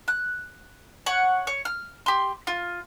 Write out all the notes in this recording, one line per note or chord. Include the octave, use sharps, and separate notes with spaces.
F#6
C#5 F#5
C#5
F6
G4 C6
F4